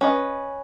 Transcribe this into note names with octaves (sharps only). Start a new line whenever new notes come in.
C#4 B4 D#5